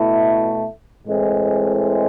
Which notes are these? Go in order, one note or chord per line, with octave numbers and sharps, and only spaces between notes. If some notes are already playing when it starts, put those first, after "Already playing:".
Already playing: B2 A3 E4
A2 E3 G#3 C4